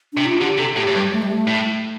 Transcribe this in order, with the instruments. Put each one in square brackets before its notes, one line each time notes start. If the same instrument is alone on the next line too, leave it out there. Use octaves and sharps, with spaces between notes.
[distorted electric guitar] C3 [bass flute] D4
[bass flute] F4
[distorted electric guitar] D3 [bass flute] G4
[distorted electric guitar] C3 [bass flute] A4
[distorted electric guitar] A2 [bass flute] G4
[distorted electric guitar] A2
[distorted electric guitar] G2 [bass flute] G3
[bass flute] A3
G3
A3
[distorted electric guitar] A2